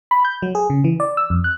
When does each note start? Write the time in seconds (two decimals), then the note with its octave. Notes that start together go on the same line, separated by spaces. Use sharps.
0.11 B5
0.25 G6
0.42 F#3
0.55 G#4
0.70 C#3
0.84 E3
1.00 D5
1.17 E6
1.30 F2
1.44 F#6